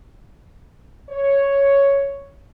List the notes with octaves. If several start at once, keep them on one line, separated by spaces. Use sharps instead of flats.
C#5